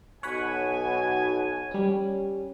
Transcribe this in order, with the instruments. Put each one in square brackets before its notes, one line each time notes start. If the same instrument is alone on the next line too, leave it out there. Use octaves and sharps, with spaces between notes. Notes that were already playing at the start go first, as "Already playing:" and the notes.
[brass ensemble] B1 B2 G#5 [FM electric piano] C#5 F#5 B5
[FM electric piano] G3 C#4